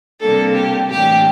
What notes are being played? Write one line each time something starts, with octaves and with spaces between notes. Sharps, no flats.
C3 G3 A#3 D4 A4
G4
A2 E3 A#3 D4 G4